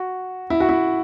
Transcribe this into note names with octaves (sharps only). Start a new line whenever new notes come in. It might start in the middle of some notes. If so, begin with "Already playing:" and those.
Already playing: F#4
E4
F#4
E4